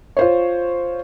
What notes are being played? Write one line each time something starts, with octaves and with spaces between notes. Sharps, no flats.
F4 C5 C#5